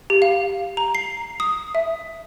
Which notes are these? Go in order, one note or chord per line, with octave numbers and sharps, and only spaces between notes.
G4
F5
A#5
C7
D#6
E5